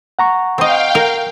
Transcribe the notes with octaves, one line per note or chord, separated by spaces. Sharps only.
F#5 A#5 C#6
C4 D#5 F5 G5
A#4